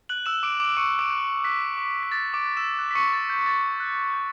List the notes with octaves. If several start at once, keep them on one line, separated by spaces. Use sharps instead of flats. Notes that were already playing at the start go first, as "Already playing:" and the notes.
F#6 F#7
E6 E7
D6 D7
D6 D7
C#6 D6 C#7
D6 D7
F#6
F#6 B6
D6
B6
D6 A6
D6 D7
F#6
E6 E7
F#6
B6
C#6 C#7
D6 A6
G6
D6 A6
F#6
G6